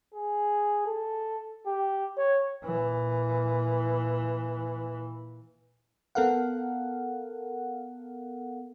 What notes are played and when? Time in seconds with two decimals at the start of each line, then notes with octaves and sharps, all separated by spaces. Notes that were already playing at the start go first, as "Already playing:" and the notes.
0.14 G#4
0.86 A4
1.66 G4
2.17 C#5
2.64 A#2 E3
6.15 B3 A4 A#4 F5 F#5